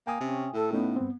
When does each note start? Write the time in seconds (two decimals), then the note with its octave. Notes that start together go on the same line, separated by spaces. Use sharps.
0.07 A#3 G5 G#5 D#6
0.20 C3 C#4
0.54 A2 A4
0.73 A3 B3 C#4 D#4
0.96 G2 C4